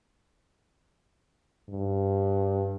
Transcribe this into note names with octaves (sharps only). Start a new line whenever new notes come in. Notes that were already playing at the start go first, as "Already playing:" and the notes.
G2